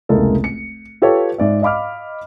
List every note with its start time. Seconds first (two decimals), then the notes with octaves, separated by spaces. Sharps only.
0.09 F1 C#2 G#3 A#3 E4 A4
0.44 C#7
1.02 F4 G4 A4 B4 C#5
1.38 G#2 D5 E5
1.62 D#5 F5 B5 D6 F6